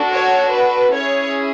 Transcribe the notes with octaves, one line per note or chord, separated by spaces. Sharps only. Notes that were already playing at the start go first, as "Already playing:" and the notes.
Already playing: D4 F#4 A4
C#5
B4
C#4 E4 G#4 C#5